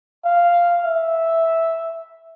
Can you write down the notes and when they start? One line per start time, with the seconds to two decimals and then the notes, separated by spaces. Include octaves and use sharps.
0.25 F5
0.85 E5